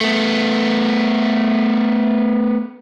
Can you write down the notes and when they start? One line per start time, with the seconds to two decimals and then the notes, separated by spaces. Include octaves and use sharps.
0.01 A3 B3